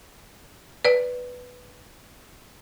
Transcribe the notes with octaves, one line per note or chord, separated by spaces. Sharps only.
B4 D5